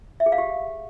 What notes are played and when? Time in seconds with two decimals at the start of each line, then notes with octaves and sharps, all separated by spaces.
0.20 E5
0.26 G#4
0.32 F5
0.38 G4